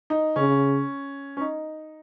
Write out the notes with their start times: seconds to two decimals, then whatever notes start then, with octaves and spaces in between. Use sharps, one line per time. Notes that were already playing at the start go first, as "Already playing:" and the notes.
0.10 D#4
0.36 C#3 C#4
1.37 C#4
1.41 D#4